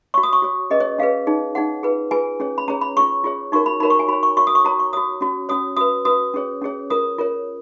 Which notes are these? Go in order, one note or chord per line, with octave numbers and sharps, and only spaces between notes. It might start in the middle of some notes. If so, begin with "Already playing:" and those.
F#4 C#5 C#6
D#6
C#6
F#4 C#5
C#4 G#4 B4 D#5
C#5
C#4 G#4 B4 F5
D#4 G#4 C#5
D#4 G#4 C#5 F#5
F4 G#4 B4
F4 G#4 B4 G#5
C#4 G#4 C#5
B5
C#4 G#4 C#5 A#5
B5
F4 G#4 C#5 C#6
F4 G#4 C#5
D#4 F#4 A#4 C#5 C#6
B5
D#4 F#4 A#4 C#5 B5
C#6
G#5
F#4 C#5 B5
C#6
F#4 C#5 C#6
D#6
C#6
F#4 C#5 A#5
C#6
F#4 C#5 D#6
C#4 F#4 C#5
C#4 F#4 C#5 D#6
F#4 B4 D#6
F#4 B4 D#6
C#4 G#4 C#5
C#4 G#4 C#5
F4 A#4 C#5 D#6
F4 A#4 C#5